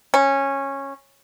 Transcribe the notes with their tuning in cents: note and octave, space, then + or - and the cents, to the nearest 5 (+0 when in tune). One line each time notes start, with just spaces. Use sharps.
C#4 -15